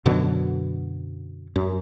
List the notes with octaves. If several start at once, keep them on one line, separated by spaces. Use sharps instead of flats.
F#2 B2 D3 F#3
F#2